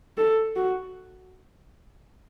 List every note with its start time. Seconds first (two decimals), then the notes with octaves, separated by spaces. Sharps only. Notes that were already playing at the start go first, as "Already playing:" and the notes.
0.17 A4
0.56 F#4